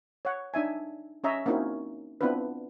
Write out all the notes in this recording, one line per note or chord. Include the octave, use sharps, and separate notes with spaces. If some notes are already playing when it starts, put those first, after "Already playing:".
C#5 F#5
D4 D#4 E5 G#5
C#4 C#5 D#5 E5 A#5
A#3 C4 C#4 D#4 E4 F#4
B3 C4 D4 E4 F4 B4